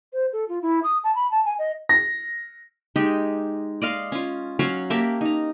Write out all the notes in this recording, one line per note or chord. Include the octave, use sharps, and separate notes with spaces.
C5
A4
F4
E4
D#6
A5
B5
A5
G#5
D#5
A#6
G#3 D#4 G4 G5
D5 D#5 F5 C6
C#4 F4
F#3 C#4 C#5 F5
A#3 G4 E5 A5
D#4 A#5